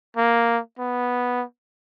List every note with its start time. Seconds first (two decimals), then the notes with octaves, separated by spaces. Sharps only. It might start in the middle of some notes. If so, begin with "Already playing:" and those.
0.17 A#3
0.79 B3